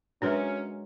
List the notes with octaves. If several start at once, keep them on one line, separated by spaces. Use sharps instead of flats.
F#3 G#3 C#4 D4 A#4 B4 E5